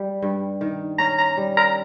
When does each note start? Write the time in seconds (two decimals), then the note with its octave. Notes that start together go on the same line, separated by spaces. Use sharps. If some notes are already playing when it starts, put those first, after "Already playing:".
Already playing: G3
0.22 G2
0.61 D#3
0.99 C#4 A#5
1.18 A#5
1.37 G3
1.57 A#5